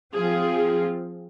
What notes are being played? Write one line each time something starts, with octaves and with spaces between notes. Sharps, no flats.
F3 C4 F4 G#4